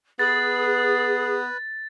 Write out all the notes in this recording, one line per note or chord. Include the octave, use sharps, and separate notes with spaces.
B3 G#4 B4 A6